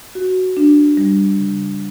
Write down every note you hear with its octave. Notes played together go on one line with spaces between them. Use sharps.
F#4
D4
G3
C#3